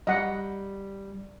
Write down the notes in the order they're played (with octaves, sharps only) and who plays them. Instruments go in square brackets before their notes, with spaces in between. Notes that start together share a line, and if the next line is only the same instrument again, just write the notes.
[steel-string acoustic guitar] G3 [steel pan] D#5 F#5